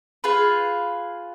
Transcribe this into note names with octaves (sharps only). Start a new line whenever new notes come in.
F4 G#4 B4